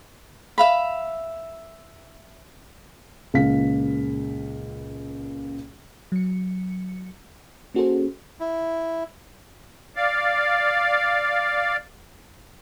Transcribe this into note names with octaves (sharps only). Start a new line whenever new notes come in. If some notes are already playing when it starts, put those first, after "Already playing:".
E5 F5 B5
C#2 A#2 F5 B6
F#3 C#7
A#3 C#4 F#4 G#4 A4 C5
E4
D5 F5